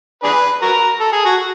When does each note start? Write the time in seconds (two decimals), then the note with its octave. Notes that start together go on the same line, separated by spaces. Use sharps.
0.24 D4 G#4 B4
0.62 F#4 A#4
1.00 A4
1.12 G#4
1.25 F#4